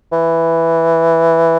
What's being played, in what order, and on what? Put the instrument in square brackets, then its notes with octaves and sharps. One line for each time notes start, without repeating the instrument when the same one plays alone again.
[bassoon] E3